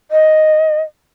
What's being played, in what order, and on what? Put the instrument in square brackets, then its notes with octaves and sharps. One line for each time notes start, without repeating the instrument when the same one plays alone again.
[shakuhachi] D#5